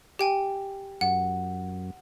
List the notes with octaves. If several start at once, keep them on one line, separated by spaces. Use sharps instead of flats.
G4 G5 G#5
F#2 F#5